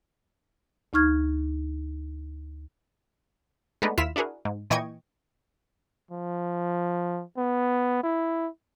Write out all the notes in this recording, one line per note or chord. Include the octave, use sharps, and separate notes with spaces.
D2 D#4 C#6 F6 G#6
G#3 A3 B3 D4 D#4
D#2 E4 F4 F6 B6 E7
D4 E4 F#4 G#4 A#4
G#2
A#2 E3 D#5 G5 C#6 G#6
F3
B3
E4